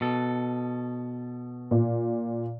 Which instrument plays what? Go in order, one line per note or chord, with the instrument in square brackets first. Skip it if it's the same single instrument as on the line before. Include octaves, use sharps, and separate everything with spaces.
[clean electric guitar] B2 A4
[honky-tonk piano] A#2